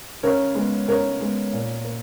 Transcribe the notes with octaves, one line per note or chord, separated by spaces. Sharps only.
C#3 A#4 C#5
G#3 B3
C#3 A#4 C#5
G#3 B3
A#2
A#3